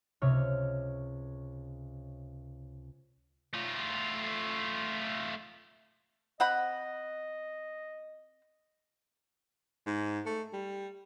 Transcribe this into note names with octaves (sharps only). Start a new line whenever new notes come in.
C#2 C3 C#5 F6
A3 F4
C4 D#5 F#5 B5
G#2
A3
G3